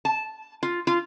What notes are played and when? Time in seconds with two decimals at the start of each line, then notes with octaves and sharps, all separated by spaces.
0.05 A5
0.63 F4
0.87 F4